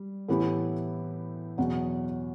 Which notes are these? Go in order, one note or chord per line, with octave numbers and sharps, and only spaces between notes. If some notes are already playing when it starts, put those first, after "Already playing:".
Already playing: G3
A2 E3 B3 E4 G4
E2 B2 F#3